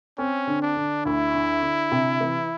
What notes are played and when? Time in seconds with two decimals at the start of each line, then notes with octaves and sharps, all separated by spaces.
0.18 C4 C#4
0.47 D3
0.62 D4
0.76 D3
1.05 D2 E4
1.34 D3
1.62 D3
1.92 C3
2.20 E3